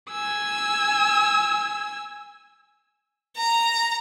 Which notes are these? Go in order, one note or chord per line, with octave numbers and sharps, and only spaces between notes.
G#5 E6
A#5